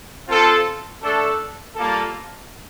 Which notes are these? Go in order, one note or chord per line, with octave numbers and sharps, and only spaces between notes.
C4 F4 A4
A3 D4 A4
G3 A#3 F4 A4